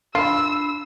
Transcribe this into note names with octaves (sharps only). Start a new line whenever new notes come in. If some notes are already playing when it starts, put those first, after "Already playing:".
D4 F4 B5 E6 C7